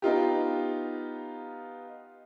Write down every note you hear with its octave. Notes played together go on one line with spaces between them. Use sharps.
B3 D#4 F4 G4